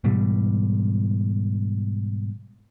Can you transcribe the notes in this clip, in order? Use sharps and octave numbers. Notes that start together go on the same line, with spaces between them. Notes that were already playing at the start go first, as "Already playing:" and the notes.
G#2 B2 E3 G3